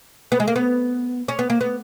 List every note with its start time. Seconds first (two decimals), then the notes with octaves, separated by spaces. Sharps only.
0.32 B3
0.40 G#3
0.48 A#3
0.56 B3
1.28 C#4
1.39 B3
1.50 A#3
1.61 B3